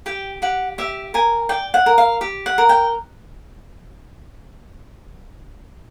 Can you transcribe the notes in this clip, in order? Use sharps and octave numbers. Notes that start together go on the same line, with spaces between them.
G4 G5
G4 F#5
G4 E5
A#4 G#5
D5 G5
F#5
A#4
F5
G4
F#5
A#4
G5